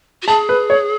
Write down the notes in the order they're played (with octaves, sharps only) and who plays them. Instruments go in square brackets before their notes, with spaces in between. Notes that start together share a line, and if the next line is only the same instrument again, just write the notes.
[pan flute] F#4
[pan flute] G#4 [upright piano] A5
[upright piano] B4
C#5